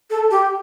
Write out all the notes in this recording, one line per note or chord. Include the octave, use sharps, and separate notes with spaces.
A4
G4